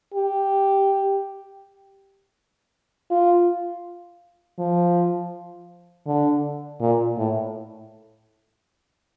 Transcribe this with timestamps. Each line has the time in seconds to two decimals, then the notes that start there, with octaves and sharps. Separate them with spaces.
0.14 G4
3.11 F4
4.59 F3
6.07 D3
6.80 A#2
7.18 A2